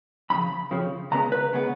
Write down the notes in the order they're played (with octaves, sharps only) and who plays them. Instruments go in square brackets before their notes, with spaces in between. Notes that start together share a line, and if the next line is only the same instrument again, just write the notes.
[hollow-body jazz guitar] F2 C#3 F3 B5
F2 C#3 F3
C#2 C#3 G#3 B3 A#5
B4
C#3 G#3 B3